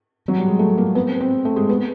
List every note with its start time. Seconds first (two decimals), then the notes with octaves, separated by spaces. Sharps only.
0.28 F#3
0.38 G3
0.48 G#3
0.59 A3
0.78 A#3
0.95 B3
1.08 C4
1.21 C4
1.45 A3
1.56 G#3
1.69 B3